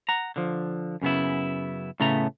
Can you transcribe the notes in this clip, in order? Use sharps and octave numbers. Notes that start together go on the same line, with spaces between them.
F#5 A#5
D3 F3
F#2 C#3 B3 E4
A2 C#3 A3 B3 A#5